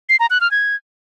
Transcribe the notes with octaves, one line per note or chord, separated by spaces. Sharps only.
C7
A#5
F#6
F6
G#6